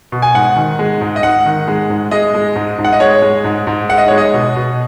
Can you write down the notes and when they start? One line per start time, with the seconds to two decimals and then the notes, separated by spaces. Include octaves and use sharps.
0.12 B2
0.22 G#5
0.34 G#2 F#5
0.56 D#3
0.79 G#3
1.01 G#2
1.16 D#5
1.23 G#2 F#5
1.45 D#3
1.68 G#3
1.90 G#2
2.11 G#3 D#5
2.34 G#3
2.56 G#2
2.78 G#2
2.85 F#5
2.93 D#5
3.00 G#3 C#5
3.22 G#3
3.44 G#2
3.67 G#2
3.89 G#3 F#5
3.98 D#5
4.08 G#3 C#5
4.18 D#5
4.33 B2
4.56 B2